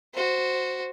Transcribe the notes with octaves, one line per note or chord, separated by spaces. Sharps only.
F#4 C5